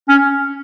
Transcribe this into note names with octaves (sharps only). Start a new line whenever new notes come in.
C#4